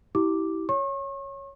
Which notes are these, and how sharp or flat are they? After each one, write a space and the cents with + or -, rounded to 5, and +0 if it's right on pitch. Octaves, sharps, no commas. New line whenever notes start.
E4 -25 G4 -20 D6 +0
C#5 +0 C#6 -40